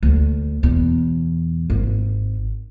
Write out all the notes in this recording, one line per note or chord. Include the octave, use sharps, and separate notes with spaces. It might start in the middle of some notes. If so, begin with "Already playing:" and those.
D2
E2 B2
G#1